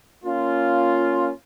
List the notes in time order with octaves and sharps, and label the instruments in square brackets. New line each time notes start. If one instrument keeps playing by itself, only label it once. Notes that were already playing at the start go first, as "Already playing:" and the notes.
[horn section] A#3 C#4 F4